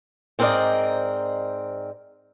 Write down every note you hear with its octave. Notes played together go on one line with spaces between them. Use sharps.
G#2 C4 A#4 B4 D5 D#5